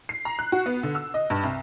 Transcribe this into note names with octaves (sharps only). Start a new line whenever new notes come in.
C7
A#5
F#6
F#4
B3
D3
E6
D#5
G2
C2